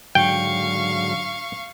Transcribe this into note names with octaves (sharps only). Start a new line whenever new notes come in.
G#2 D3 F#3 F5 G5 C#6